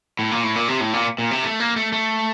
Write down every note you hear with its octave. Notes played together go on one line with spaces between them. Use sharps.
A2
A#2
A2
A#2
C3
A2
A#2
A#2
C3
A3
A#3
A3
A3